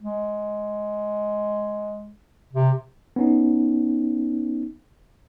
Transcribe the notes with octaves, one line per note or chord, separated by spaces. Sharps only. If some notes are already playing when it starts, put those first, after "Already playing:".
G#3
C3
B3 C#4 D#4